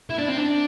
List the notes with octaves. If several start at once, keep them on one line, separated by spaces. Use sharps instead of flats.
E4
D4
C4
D4